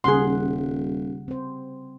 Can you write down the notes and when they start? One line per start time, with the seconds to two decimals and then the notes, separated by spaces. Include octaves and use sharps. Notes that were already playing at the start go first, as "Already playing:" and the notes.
0.04 D#1 C#3 G3 G#4 F#5 C6
1.28 C4 C5